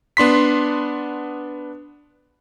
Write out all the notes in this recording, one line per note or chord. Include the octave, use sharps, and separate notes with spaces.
B3 D4 C6 B6